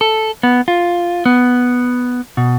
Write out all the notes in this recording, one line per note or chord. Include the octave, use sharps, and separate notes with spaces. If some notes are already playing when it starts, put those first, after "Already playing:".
A4
B3
F4
B3
B2